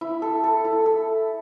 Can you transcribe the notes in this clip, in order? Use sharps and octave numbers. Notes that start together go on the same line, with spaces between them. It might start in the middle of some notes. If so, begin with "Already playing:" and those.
E4
A4
A4
E4
A4